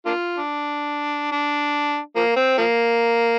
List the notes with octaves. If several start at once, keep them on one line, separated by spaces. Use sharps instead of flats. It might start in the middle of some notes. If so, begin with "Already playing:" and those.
A#3 D4 F4
D4
D4
F3 A#3
C4
F3 A#3